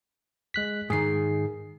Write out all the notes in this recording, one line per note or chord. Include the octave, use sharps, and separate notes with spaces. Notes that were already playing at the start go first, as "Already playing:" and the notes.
G#3 F#6 B6
G#2 D#3 G#4 C7